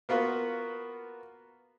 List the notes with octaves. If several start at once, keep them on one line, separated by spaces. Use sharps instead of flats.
A#3 B3 F4 F#4 B4